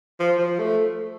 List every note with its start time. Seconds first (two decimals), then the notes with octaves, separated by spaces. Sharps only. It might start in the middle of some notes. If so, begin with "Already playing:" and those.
0.20 F3
0.39 F3
0.59 A3